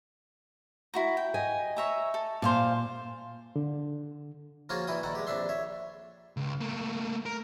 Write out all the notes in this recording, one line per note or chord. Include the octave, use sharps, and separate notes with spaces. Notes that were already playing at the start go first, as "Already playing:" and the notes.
E4 F#4 A#5
G5
D#5 G#5
C#5 E5 A#5
A4
A#2 C5 F5 A5
D3
F3 A#3 C#4 F4 F#4 G#4
A#2 E3 E4 G5 D#6
A#2 D#3 A4 F#5
G#3 G4
A#1 F2 D4 E5 C6
C#5 E5
C#2
A3 A#3
A#4